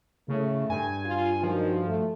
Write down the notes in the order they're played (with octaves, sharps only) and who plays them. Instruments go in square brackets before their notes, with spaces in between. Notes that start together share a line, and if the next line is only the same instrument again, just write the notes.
[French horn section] A2 A3 [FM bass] C#3
[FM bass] G2 [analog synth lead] G#5
[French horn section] F4
[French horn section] D#3 F#4 [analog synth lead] F3
[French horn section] A3